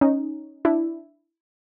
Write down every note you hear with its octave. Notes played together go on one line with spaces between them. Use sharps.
C#4 D#4
D4 E4